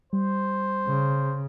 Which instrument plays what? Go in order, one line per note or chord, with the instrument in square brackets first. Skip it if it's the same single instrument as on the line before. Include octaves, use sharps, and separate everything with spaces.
[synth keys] G3 [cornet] C5
[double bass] C#3